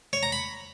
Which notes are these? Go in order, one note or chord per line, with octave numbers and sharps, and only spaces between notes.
C#5
A#5
B5